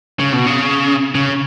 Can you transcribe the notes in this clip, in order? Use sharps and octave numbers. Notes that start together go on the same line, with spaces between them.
C#3
B2
C#3
C#3